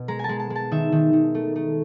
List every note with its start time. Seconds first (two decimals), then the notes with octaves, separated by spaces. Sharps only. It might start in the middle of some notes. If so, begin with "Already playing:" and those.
Already playing: B2
0.08 G#3 A#5
0.19 G#5 A5
0.29 G#3
0.40 A5
0.50 G#3
0.56 A5
0.72 D#3 E5
0.92 D#3
1.13 D#3
1.35 A3
1.56 A3